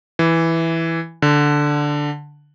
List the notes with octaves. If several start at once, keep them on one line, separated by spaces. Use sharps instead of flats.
E3
D3